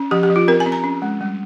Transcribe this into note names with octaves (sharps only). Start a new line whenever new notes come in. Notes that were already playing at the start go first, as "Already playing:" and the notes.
Already playing: C#4
F3 G4
G4
F3
F4
C4 A#4
G#5
C4
A#5
C#4
G#3
G3